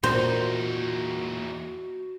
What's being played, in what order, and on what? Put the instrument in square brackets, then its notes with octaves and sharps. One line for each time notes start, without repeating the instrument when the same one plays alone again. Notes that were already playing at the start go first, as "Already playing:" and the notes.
[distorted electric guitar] E2 D#4 [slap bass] A#2 [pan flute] F#4 [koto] C5